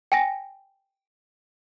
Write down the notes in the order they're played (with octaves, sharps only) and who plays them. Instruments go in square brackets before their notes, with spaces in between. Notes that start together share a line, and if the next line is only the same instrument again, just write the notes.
[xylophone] G5 G#5 A#6